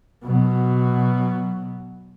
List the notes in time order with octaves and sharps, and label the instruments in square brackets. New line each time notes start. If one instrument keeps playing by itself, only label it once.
[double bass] B2 F#3